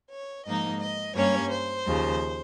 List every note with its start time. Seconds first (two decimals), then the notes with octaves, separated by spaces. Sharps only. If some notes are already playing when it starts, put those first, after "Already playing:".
0.10 C#5
0.45 G#2 F3 A#3 D#4 D#5
0.81 D#5
1.15 G2 G3 A#3 C#4 C#5
1.50 C5
1.86 D#2 C#3 F3